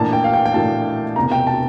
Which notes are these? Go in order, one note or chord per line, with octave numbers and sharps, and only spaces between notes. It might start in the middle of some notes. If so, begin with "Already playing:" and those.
Already playing: A#1 A2 E3 A#3 A5
G5
F5
G5
G5
A#1 A2 E3 A#3 A5
E1 E2 C3 A#5
G5
A5